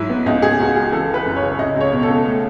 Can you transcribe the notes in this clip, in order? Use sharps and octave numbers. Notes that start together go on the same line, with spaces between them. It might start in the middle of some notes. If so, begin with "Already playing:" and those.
Already playing: G#2 F#3 E4
B3
C#2 D#5
C#2 G#4
C#2 F#4
G#3 G#4
E3 A4
E3 B4
F#2
C#5
C#3
C#2 D#5
C#2 C#5
B2
A4
C#2
A3